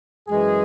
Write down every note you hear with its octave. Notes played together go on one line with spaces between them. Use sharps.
F#2 E3 G#3 G#4